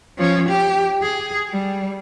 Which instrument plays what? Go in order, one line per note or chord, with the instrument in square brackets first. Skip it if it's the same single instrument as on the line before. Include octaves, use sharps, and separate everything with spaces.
[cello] F3 C#4
G4
G#4
G3